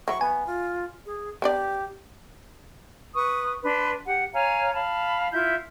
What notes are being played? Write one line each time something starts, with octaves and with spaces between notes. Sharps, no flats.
F#3 E4 C#6
B3 G#5
F4
G#4
B3 D4 G4 D5
B4 C#6 D#6
D4 B4 C6
G4 F#5
C#5 F5 G#5 A#5
F5 A5 B5
E4 F4 E5 G6